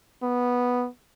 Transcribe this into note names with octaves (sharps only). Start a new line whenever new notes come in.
B3